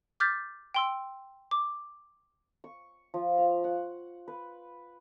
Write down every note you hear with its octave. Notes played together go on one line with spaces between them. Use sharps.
D6 F6 G6 A6 B6
G5 C6 E6
D6
C#6
F3
F5
F#5
B4